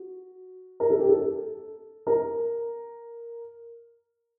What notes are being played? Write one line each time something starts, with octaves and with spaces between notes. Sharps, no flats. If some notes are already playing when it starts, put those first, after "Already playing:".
Already playing: F#4
A#4
A4
G4
A4
A#4